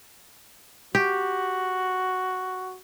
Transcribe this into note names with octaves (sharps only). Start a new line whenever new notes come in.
F#4 G4